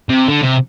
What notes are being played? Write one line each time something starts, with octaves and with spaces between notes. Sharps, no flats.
C3
D3
C3